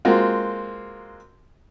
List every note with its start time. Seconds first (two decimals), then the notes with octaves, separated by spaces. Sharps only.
0.05 G#3 A#3 C4 F4 F#4